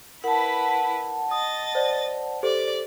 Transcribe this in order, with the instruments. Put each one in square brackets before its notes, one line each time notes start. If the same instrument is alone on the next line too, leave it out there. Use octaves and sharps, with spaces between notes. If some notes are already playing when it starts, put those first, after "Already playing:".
[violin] E4 B4 [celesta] A#4 [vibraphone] F#5 A5
[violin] D#5 A6 [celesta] D#6
[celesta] C5 D5
[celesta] G4 A4 C5 [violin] D5